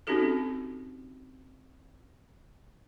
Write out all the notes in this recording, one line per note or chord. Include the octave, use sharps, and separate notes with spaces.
C4 C#4 D#4 F#4 G4 A4